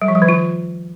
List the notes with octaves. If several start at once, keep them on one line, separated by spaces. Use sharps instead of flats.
G3
F3
G3
D#3
F4